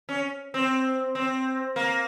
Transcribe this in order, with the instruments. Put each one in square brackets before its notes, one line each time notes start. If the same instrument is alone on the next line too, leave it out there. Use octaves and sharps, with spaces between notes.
[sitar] C#4
C4
C4
A#3